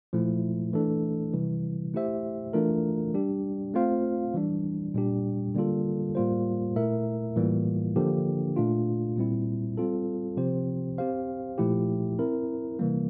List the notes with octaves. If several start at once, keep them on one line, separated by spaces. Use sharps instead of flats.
A#2 F3 A3 E4
E3 A3 D4 A4
C3 E3 G3
A3 E4 G4 C5 E5
E3 A3 D4 F4 A#4
G3 D4 G4
A3 C4 F4 C5 F5
E3 G3 D4
A#2 G3 D4 G4
D3 G3 A#3 F4 A4
A2 G3 A#3 F4 C5
A#2 A3 E4 A#4 E5
A2 E3 G3 A#3 F4
D3 F3 A#3 D4 G4
A#2 A3 D4 F4
A#2 G3 C4 E4
G3 C4 F4 A4
C3 F3 C4 G4 C5
C4 G4 C5 F5
A#2 F3 A3 E4 G4
C4 E4 A#4
C3 E3 G3 A#3